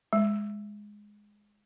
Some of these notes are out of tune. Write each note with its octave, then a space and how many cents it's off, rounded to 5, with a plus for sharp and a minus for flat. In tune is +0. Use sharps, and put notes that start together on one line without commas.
G#3 +0